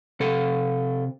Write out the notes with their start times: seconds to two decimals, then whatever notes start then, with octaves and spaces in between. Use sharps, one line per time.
0.20 C3 A4